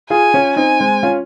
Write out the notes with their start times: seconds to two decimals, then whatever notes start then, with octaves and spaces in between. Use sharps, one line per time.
0.10 F4 G#4 G#5
0.34 C#4 F4
0.56 C4 D#4 G#5
0.80 G#3 C4
1.03 C#4 F4